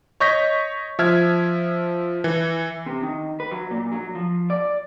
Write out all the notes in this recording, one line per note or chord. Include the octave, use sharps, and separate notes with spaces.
C#5 D#5 C#6 G6 A#6 B6
F3 E5 F6 G#6
E3
C3
D#3
B4
F#3
A#2
F#3
F3
D5